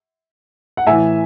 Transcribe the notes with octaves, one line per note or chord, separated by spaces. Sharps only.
F#5
A2 E3 E5 G#5